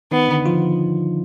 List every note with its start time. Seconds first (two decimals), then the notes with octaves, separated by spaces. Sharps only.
0.12 D#3 B3 D#4
0.29 D3 D4
0.46 F3 F4